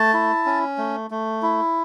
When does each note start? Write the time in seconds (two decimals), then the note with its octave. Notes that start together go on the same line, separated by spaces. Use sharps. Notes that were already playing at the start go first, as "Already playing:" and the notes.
Already playing: A3 A5
0.14 E4
0.46 C#4
0.78 A3
1.11 A3
1.42 E4